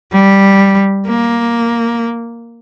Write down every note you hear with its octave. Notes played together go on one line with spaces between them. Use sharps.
G3
A#3